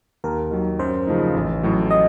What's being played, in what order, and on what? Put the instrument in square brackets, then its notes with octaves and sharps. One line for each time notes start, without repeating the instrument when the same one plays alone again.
[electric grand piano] D#2 [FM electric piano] A#4
[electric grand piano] D#3 F#3
[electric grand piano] F#2 [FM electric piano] C5
[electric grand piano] C#3 F3 A3 D#4
A1
A2 F#3
[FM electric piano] D#5